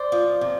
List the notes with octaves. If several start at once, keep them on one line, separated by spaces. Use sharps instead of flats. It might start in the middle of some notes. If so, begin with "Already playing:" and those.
Already playing: C5 D5
F3
C3